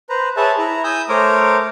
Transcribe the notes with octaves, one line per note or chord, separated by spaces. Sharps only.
B4 C5 A#5
G#4 B4 C#5 E5 A5
E4 A#5
G#5 D#6 E6 G6
A3 A#4 C5 C#5 A#5 D6